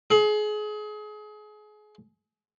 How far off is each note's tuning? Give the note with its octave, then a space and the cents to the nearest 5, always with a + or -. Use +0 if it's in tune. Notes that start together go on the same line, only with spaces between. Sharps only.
G#4 +30